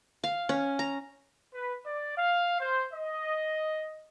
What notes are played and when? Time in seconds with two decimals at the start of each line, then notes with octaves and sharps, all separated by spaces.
0.24 F5
0.49 C#4
0.79 A#5
1.54 B4
1.86 D5
2.18 F5
2.61 C5
2.94 D#5